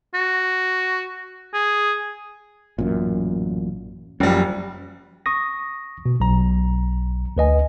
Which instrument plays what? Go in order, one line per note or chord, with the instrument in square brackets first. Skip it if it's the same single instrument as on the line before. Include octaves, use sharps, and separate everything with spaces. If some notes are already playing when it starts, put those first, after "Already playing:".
[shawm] F#4
G#4
[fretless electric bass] A1 F#2 A#2
[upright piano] F#1 G3 [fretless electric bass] F3 C#4
[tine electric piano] C#6 D#6 A#6
B2
B1 A#5
D2 B4 D#5 G#5